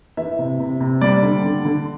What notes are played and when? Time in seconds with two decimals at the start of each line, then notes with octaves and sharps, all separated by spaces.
0.17 E3 E5
0.39 C3
0.60 C3
0.80 C3
1.01 G3 D5
1.23 D3
1.44 D3
1.65 D3